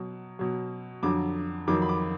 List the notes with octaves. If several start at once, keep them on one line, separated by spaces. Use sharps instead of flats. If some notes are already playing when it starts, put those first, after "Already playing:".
Already playing: B2 F#3
B2 F#3
F2 D3 F#3 D6
F2 D#3 F#3 D6
B5
D6